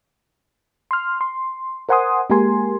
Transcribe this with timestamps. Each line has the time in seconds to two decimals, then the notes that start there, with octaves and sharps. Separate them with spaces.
0.91 C6 F6
1.21 C6
1.89 A#4 C5 F#5 G#5 C6 D#6
2.30 G#3 A#3 G4 A#4 G#5 C6